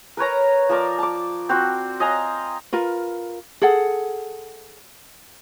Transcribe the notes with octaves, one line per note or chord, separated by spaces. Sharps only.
A#4 B4 C#5 A#5
F3 A#4 D5
A5 D6
C4 F#4
D#5 F5 G#5 A#5
F4 A#4 B4
G#4 A4 F#5